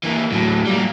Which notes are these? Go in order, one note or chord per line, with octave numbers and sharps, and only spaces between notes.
E3 A#3
A2 F#3
G3 A#3